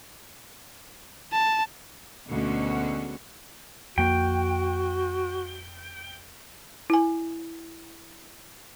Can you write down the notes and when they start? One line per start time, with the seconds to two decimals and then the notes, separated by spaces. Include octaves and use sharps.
1.32 A5
2.29 D2 B2 D3 G#3 C#4 F#4
3.98 F2 A#3 F#4 G5
6.90 E4 G#5